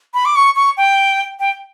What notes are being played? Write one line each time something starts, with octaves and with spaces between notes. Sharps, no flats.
B5
D6
C#6
C#6
G5
G5